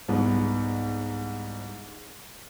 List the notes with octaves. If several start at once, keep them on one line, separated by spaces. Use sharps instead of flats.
C2 G#2 B3